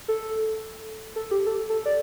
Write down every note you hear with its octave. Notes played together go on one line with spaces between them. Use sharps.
A4
A4
G4
A4
A4
D5